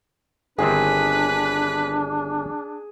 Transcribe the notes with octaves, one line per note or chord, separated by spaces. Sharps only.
G1 D#3 C4 D4 G#4 B4